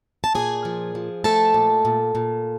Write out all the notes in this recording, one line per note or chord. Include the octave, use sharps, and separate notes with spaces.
A5
A#2 G#4 G#5
F3
F3
A3 A4 A5
A#2
A#2
A#2